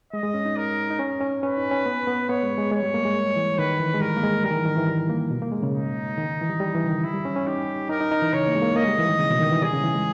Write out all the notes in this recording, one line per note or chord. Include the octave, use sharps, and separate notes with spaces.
G#3 D#5
G#3
C#4
D#4
A#4
D#4
C#4
C#4
C#4 B4
D#4
C#4
B3
B3
B3 C#5
G#3
G#3
G#3 C#5
G3
A#3
G#3
E3
D#3 B4
E3
G#3
G3 A#4
A#3
G#3
G3 A#4
D#3
E3
D#3
E3
G3
A#3
B2
A#3
G#3
C#3
D#4
D#3
E3
G3
G3
E3
C#3
D#3
E4
G3
C#4
C#4
D#4 G4
D#4 A#4
D#4
D#4
E3
C#3 C#5
A#3
G#3
A#3
A#3 D#5
G#3
G3
E3
D#3
C#3
B2
D#3
E3
G3 G#4
C#3
E3
G#3